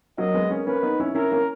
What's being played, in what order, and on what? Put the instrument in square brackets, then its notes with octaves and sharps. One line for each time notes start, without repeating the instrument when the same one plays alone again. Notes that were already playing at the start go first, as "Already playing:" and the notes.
[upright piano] F#3 A#3 [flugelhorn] D#5
[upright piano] G#3 B3
A#3 C#4
[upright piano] A#3 C#4 [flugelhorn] B4
[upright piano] B3 D#4
C#4 E4
[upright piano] C#4 E4 [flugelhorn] A#4
[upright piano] A#3 C#4